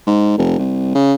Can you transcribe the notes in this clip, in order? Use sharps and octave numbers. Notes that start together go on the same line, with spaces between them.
G#2
F1
C2
C#3